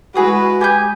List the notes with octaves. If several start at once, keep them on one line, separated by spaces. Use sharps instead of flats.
G#3 E4 F#4 G#4 B4 D#6
G4 G#5 D#6 G6